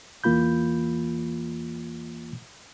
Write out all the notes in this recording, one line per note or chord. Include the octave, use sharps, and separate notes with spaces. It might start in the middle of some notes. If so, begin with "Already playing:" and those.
E2 E3 A#3 F4 B5 G6